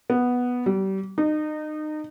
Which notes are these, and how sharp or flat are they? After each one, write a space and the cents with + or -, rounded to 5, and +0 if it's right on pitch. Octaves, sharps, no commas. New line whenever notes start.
B3 -5
G3 -35
D#4 -30